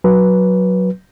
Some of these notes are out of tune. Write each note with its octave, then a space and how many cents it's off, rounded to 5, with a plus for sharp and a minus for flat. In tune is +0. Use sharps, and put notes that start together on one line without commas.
F#3 +0 B4 -15